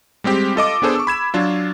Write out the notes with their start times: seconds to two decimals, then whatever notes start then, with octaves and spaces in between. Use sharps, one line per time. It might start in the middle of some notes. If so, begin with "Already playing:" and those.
0.24 G3 G#3 C4 G4
0.56 F4 A4 D#5 D6
0.82 B3 D4 G#4 A4 C5
0.95 C#6 E6
1.07 B5 G#6 E7
1.34 F#3 D4 F4